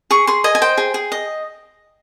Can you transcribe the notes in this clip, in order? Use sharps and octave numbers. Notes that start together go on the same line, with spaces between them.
G#4 C#6
G#4 C6
D#5 G#5
G#5
C5 G5
G#4
G#4
D#5